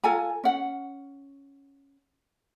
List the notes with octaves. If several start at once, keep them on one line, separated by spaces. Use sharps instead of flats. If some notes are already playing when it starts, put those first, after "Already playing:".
F4 A4 G#5 A#5
C#4 F#5